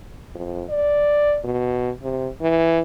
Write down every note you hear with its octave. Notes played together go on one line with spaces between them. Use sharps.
F2
D5
B2
C3
E3